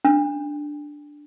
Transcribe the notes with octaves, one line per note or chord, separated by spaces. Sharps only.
D4